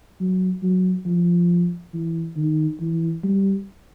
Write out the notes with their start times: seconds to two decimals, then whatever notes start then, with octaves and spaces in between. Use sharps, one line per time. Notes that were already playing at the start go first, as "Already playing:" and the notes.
0.20 F#3
0.62 F#3
1.05 F3
1.93 E3
2.36 D#3
2.80 E3
3.24 G3